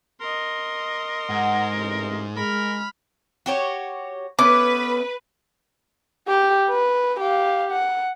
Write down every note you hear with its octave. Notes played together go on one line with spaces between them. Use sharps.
A#4 D#5 C6
G#2 F#5
A1 C3
G#3 A#4 B5 F6
F#4 G4 C#5
A3 B3 C#4 B4 D6
G4 G5
B4
G4 F5
F#5